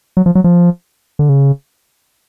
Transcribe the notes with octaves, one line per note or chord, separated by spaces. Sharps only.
F#3
F3
F#3
F3
D3
C#3